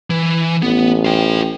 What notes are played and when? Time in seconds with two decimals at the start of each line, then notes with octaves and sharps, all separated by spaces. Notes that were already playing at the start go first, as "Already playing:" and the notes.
0.10 E3
0.62 A1 B3
1.05 F4 G5